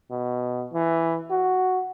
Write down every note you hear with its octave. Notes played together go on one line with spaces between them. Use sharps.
B2
E3
F#4